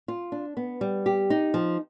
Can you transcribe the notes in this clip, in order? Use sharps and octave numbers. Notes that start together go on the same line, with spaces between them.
F4
D4
B3
G3
G4
D#4
F3